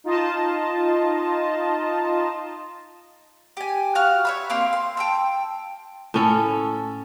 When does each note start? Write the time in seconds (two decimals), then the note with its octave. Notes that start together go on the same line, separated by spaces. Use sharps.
0.04 D#4 F4 D#5 A5
3.57 G4 G#5
3.95 F#4 F5 F6 F#6
4.25 C#5 E5 B5
4.50 A#3 C4 F5 C6
4.73 C6
4.97 G5 A5 E6
6.14 A2 C#4 A4